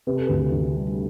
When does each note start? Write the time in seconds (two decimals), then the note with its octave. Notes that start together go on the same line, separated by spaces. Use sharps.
0.07 C3 B4
0.17 A4
0.27 D2 B4
0.52 D2
0.75 G3